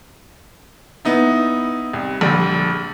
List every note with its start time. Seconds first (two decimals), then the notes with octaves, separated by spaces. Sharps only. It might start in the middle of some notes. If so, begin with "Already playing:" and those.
1.05 B3 D#4 E4
1.93 C2
2.21 A#1 D3 G3